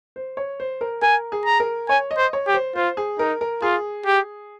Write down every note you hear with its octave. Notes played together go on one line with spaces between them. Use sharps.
C5
C#5
C5
A#4
A#4 G#5
G#4
A#5
A#4
C#5 G#5
D#5
C5
C#5
G4
C5
F4 C5
G#4
D#4 A#4
A#4
F4 G#4
G4